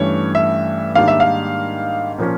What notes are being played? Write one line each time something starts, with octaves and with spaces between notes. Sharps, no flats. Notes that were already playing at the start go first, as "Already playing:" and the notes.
Already playing: G2 E3 A3 C#4 C#5
E5
G#2 D#3 G3 A#3 D4 F5
E5
F5
A#2 F3 A#3 C#4